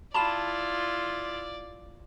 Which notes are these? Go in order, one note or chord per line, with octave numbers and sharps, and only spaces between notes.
E4 F4 D5 A5 B5 E7